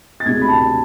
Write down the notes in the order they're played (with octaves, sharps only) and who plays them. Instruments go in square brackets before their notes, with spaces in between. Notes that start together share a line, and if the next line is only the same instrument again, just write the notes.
[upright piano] A6
D2 C3 G#3 G#6
B5
A5